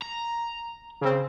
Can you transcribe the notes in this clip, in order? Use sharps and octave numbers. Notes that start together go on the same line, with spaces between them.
A#5
C#3 C4